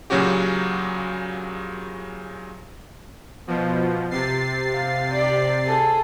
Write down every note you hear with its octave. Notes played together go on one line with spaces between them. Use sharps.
A#2 C#3 F#3 C#4 F#4 G4
B2 F3
C3 A6 C7
F5
G4 D5
G#4 A4